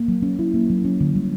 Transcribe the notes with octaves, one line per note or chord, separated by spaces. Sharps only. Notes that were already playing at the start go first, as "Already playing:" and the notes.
Already playing: A#3
F#3
C#4
E4
A#3
F#3
C#4
D3
G3